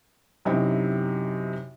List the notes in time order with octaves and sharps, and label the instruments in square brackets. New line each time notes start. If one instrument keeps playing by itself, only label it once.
[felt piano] F#2 C3 F#3 D#4 E4 G5